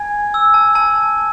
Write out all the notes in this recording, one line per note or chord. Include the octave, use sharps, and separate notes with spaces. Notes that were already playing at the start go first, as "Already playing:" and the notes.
Already playing: G#5 G#6
E6
A5
A5